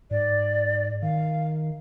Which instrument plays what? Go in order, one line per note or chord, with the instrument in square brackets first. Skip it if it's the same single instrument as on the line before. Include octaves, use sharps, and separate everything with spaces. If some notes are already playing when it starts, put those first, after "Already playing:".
[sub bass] G#2 [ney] D5
[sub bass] D#3 [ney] F5